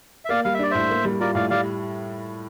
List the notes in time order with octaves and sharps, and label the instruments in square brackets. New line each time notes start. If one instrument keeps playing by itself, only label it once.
[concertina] E5
[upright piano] A#3 [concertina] D5 F5
[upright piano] G3 [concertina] F5
[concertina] E5
[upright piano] D4 [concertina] D5
[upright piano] A2 [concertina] C5 E5
[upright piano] A#3
G3
[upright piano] F4 [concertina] A#4 D5
[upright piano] A2 [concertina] D5 F5
[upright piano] G3 [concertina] D5 F5